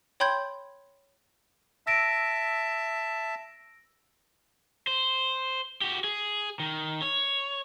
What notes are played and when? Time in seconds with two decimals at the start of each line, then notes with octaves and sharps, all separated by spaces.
0.20 C#5 G5 B5 C6 G6 G#6
1.87 E5 A5 E6 A#6 D7
4.87 C5
5.81 F#4 G4
6.04 G#4
6.60 D#3
7.02 C#5